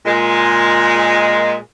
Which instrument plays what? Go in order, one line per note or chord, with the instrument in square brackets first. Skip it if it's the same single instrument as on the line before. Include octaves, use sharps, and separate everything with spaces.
[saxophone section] A#2 G#3